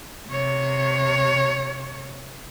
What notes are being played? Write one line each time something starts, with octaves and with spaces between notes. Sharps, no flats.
C3 C#5